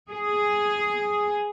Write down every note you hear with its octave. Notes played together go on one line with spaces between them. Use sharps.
G#4